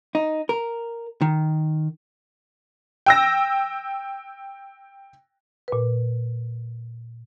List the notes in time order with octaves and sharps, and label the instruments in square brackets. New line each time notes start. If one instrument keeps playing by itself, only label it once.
[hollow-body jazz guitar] D#4
A#4
D#3
[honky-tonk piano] G5 E6 A#6
[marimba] A#2 B4